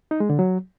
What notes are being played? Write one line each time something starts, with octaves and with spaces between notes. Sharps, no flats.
D#4
G#3
D3
F#3